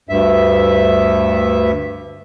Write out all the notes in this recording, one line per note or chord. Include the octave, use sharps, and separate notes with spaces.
D2 G2 E5